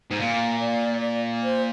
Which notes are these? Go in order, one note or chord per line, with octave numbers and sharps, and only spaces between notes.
G#2
A#2 F5
D5
D5
C5